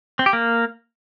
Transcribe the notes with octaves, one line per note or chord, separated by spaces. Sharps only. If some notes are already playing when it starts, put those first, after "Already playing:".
C4
G4
A#3